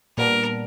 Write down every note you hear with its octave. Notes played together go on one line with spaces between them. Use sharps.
A#2 G3 B3 D4 A#4